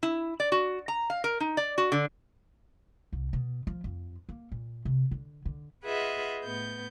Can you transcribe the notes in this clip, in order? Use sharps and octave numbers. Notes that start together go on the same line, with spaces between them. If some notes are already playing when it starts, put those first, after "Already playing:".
E4
D5
F#4
A#5
F5
A#4
D#4
D5
F#4
D3
C2
B2
F3
F2
A#3
A#2
C3
D3
D3
F4 G#4 B4 D#5 E5 F#5
A2 B3 G6